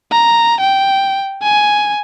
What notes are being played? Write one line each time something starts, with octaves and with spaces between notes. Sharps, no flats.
A#5
G5
G#5